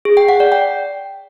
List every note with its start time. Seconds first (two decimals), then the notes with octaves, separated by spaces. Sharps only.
0.05 G#4
0.17 G5
0.29 F#5
0.40 D5
0.52 G5